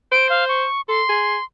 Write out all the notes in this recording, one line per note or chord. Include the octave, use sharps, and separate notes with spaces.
C5 D7
F5
C#6
A4 C6
G#4